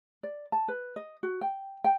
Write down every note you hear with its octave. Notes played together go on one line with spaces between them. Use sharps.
D5
A5
B4
D#5
F#4
G5
G5